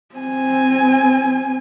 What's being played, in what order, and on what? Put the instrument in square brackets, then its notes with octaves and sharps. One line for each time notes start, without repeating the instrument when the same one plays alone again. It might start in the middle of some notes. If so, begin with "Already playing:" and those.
[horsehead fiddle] C4 G#5